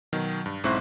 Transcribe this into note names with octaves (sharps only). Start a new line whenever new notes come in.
B2 D#3 F#3
G2
B1 G#2 C4 E4 C#6 F#6